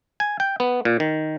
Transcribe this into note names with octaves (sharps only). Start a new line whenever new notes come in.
G#5
G5
B3
A#2
D#3